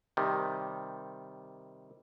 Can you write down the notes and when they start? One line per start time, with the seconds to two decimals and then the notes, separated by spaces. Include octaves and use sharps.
0.17 C3 D#3 G3